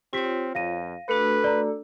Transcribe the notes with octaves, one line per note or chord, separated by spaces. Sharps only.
C4 F4 G4 C#5 B6
F2 F5 A#6 D#7
A3 D4 F#4 A4 B4
D5 A#5